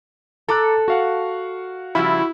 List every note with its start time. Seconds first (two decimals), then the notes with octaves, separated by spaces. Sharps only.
0.49 A4 A#5 D6 F#6
0.88 F#4 F5 F#5
1.95 C#3 F3 G3 E4 F#4 B5